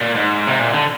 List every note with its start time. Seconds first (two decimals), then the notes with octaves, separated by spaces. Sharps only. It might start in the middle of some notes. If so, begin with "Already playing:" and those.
0.01 A#2
0.16 G#2
0.47 C3
0.59 A#2
0.74 D3